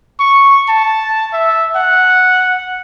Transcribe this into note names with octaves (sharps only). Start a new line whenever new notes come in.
C#6
A5
E5
F#5